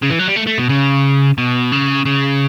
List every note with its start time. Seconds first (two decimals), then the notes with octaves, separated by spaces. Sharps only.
0.02 C#3
0.10 E3
0.19 F#3
0.27 G3
0.36 A3
0.47 A3
0.58 B2
0.69 C#3
1.38 B2
1.72 C#3
2.05 C#3